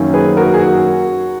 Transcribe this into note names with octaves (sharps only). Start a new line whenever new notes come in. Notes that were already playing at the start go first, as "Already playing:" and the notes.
Already playing: F#2 D#3 A#3 C#4
G#4 B4
F#4 A#4
G#4
F#4